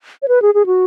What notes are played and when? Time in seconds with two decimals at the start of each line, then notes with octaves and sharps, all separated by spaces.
0.22 C#5
0.28 B4
0.42 G#4
0.54 G#4
0.66 F#4